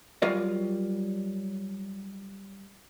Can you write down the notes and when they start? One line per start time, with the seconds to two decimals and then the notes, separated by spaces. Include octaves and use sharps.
0.22 F#3 G3 F4 A#4 D5 D#5